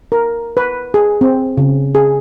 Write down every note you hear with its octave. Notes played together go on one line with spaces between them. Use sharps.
A#4
B4
G#4
C4
C#3
G#4